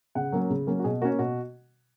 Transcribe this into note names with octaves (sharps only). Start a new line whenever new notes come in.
C#3 F#5
F#3 A#3 C#4
C#3
F#3 A#3 C#4
F#4
B2 G#4
A#3 C#4 F#4
B2 F#4